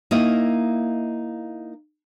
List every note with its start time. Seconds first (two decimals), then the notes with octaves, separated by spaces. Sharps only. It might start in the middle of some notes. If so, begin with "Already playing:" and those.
0.11 A#3 D#4 E4 A#4 D#5